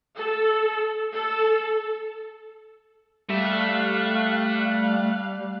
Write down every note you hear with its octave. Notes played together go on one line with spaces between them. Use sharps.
A4
A4
G3 A3 E5 F5 F#6